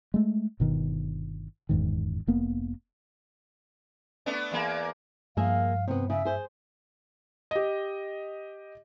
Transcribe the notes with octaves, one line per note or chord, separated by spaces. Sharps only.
G#3 A3
G1 B2 D#3
F#1 E2 G#2 D#3
F1 A#3 B3
A3 B3 D4
E2 A#3
G2 F3 A#3 G#4 E5 F5
C3 B3
C#3 E5
G#4 C5
G4 D#5